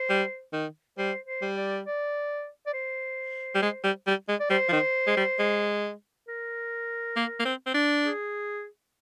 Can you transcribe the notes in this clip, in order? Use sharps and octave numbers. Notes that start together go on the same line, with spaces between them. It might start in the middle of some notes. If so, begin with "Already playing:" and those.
Already playing: C5
G3
D#3
G3 C5
C5
G3
D5
D5
D5
C5
G3
G#3
G3
G3
G#3
D5
G3 C5
F3
D#3
G#3
G3
G#3
A#4
A#3
A#3
C4
C4
D4
G#4